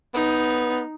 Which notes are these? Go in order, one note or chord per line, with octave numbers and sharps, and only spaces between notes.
B3 D#4